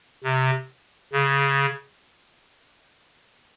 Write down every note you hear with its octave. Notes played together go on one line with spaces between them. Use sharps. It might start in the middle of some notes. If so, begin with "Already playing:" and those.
C3
C#3